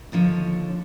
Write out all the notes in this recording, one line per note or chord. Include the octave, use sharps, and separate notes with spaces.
D#2 D3 F3 C#5